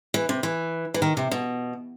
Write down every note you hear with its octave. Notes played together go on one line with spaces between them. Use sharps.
E3
C3
E3
E3
D#3
C3
B2